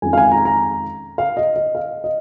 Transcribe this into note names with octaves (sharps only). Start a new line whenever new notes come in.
F2 D#3 G#3 C#4 G#5
F5
G#5
A#5
A#5
F5
D#5
D#5
F5
D#5